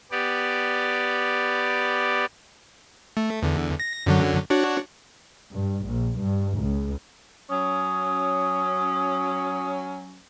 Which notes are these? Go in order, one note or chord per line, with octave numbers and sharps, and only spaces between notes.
B3 G4 D5
A3
E2 D3
A#6
F#2 D3 F#3
D4 F#4 C#5
G2
A#1
G2
C#2
F#3 C#4 D#6